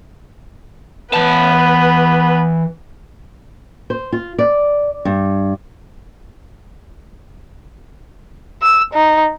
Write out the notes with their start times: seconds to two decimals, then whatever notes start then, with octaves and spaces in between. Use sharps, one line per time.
1.14 E3 B3 B4 A5
3.90 C5
4.12 F4
4.39 D5
5.05 G2
8.62 E6
8.94 D#4